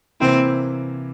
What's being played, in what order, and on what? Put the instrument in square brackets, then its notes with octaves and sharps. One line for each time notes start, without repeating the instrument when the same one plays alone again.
[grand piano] C3 E3 A#3 E4 [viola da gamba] C4